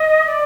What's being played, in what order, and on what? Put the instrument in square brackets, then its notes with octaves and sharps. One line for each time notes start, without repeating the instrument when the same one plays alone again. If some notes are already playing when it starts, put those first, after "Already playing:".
Already playing: [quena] D#5
D#5
D5